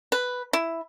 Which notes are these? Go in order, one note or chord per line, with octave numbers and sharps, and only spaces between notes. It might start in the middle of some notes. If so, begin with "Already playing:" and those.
B4
E4